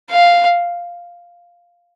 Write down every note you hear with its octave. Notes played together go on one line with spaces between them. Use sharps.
F5